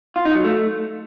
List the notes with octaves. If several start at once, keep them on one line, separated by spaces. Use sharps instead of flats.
F4
D#4
F#3
A3